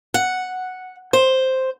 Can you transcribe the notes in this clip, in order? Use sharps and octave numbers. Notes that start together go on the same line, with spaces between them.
F#5
C5